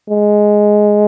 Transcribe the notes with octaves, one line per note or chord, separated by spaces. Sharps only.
G#3